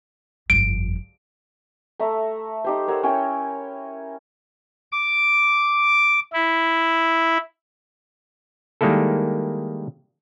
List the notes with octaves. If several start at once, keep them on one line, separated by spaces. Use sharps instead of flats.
G1 F2 D7
A3 E5 A#5
D#4 G4 C5
A#4 C#5 F#5 E6
C#4 E4 G5
D6
E4
D#3 G3 G#3 A#3 E4 A4